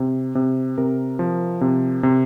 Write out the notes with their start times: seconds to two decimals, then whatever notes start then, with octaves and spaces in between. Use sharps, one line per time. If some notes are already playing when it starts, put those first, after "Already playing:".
Already playing: C3
0.35 C3
0.78 C3 A#4
1.19 F3
1.61 C3
2.03 C3